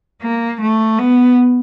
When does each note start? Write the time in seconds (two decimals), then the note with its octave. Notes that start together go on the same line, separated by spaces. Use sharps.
0.22 A#3
0.61 A3
0.99 B3